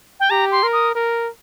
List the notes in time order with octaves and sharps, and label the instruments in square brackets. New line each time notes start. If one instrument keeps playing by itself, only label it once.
[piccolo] G5
[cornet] G4 [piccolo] A#5
[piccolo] C6
[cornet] A#4
[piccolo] D#6
[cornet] A#4